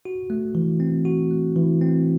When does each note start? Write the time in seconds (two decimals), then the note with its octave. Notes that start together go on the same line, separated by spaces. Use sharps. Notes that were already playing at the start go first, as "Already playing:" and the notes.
0.05 F#4
0.30 A3
0.55 E3
0.80 C4
1.05 F#4
1.31 A3
1.56 E3
1.81 C4